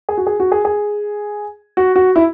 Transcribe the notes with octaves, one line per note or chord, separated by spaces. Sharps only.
G#4
F#4
G#4
F#4
G#4
G#4
F#4
F#4
E4